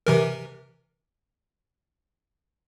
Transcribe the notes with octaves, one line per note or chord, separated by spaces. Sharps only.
C3 E3 A#4